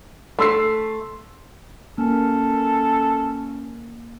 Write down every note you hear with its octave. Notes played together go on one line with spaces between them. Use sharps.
A3 C6 E6 C7
A#3 C#4 A4